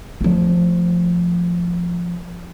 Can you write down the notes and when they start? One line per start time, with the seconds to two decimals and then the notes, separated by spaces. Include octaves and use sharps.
0.21 F3 A3